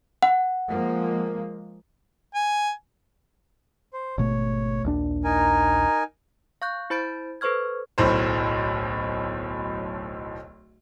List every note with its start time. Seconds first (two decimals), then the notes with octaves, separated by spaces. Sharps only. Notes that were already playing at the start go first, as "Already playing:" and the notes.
0.23 F#5
0.69 F3 G#3 A#3
2.35 G#5
3.93 C5
4.18 G#1 B2 A3 C#5
4.84 A#1 D#2 D4
5.24 D#4 A#4 G#5
6.62 F5 C#6 F#6 G6
6.90 E4 C5 B5 G6 A6 D7
7.41 A4 B4 C5 C#6 F6 G#6
7.98 D1 B1 A2 C5